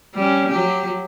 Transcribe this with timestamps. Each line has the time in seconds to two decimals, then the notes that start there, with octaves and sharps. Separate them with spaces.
0.15 G3 C#4
0.49 F#3 G4